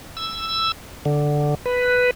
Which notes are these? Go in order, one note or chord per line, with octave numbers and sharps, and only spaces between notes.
E6
D3
B4